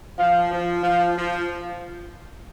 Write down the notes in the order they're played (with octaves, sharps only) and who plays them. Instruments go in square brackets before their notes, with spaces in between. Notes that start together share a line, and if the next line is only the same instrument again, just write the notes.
[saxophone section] F3 [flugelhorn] F5
[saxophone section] F3
[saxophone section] F3 [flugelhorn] F5
[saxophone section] F3